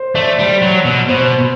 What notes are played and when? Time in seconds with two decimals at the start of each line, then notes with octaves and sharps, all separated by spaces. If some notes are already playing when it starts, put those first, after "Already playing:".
Already playing: C5
0.15 A3 D5
0.38 G3 D5
0.62 F#3
0.85 B2
1.09 B2 C5